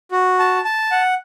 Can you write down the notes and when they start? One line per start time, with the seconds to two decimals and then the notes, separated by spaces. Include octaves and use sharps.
0.12 F#4
0.39 A5
0.65 A5
0.91 F#5